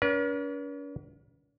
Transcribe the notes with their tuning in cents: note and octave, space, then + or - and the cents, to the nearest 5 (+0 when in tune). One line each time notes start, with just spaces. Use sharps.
C#4 +45 B4 -45